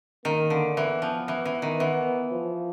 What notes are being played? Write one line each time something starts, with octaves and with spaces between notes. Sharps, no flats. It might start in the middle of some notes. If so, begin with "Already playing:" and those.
D#3 A#3
D3
E3 B3
F3
E3
E3
D#3
E3 B3
F3